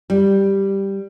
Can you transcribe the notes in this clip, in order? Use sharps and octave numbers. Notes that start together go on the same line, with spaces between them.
G3